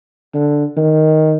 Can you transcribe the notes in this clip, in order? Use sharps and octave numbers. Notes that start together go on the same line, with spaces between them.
D3
D#3